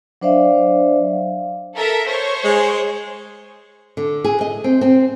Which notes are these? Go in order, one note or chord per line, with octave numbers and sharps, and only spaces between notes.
F#3 D4 C5 D5 E5 F5
A4 A#4 E5
C5 C#5 C#6
G#3
D3
G#4
D#5
C4
C4